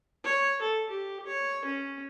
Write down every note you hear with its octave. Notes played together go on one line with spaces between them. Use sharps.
C#5
A4
G4
C#5
C#4